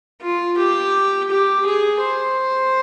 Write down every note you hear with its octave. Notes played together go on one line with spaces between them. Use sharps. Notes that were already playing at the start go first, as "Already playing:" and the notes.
F4
G4
G4
G#4
C5